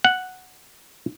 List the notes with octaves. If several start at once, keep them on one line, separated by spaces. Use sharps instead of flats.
F#5